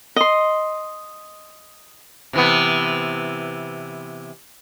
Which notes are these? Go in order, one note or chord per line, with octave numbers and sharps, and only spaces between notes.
D#5 C6
C3 E3 B3